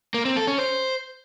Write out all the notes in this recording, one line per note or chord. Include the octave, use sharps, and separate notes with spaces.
A#3
C4
A4
C#4
C5